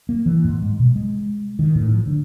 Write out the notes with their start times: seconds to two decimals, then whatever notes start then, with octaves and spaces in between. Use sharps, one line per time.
0.09 A#3
0.26 E3
0.44 G#2
0.62 G#3
0.79 B2
0.96 G#3
1.59 D#3
1.75 A2
1.93 F3
2.07 D3